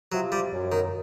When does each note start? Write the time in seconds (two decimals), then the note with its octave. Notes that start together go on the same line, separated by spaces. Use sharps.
0.12 C3 F3 F#3
0.32 G3
0.52 F#2
0.72 D#3